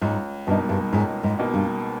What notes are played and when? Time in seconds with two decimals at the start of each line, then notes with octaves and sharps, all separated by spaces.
0.01 C#2 G#2
0.47 G2 B2 A#3 D#4
0.69 G2
0.92 C#2 G#2
1.23 G#2
1.39 B2 A#3 D#4
1.54 G2